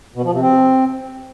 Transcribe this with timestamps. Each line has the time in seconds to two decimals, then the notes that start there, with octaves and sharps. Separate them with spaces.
0.15 B2
0.24 F3
0.33 C3
0.42 C4